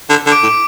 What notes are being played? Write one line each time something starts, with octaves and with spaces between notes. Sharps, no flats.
D3
D3
D6 D7
A2